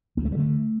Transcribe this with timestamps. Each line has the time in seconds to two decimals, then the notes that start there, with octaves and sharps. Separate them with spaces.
0.17 D2 A#3
0.25 A3
0.32 G3
0.36 D3 A3